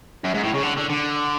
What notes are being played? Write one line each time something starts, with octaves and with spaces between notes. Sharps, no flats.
F#2
G#2
A2
C#3
D3
D3
D3